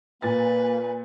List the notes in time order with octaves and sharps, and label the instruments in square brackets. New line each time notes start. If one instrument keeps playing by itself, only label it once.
[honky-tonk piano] A#2 G#5 A6 [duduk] A#3 [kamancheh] B4